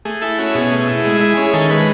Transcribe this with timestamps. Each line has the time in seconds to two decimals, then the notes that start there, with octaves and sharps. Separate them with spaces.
0.05 A3 G#4
0.21 E4 A4
0.38 C#4 F#4
0.55 B2 G#4
0.72 A3
0.88 E4
1.04 G#3
1.21 E4
1.37 C#4
1.46 G#4
1.54 D#3 A4
1.70 G#3 B4